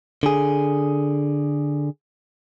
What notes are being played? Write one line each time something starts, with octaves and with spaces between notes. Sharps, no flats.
D3 G#4